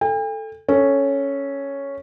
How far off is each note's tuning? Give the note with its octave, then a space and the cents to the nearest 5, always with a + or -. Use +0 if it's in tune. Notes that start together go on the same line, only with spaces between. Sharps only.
A4 +0 G5 +45
C#4 +0 A4 +0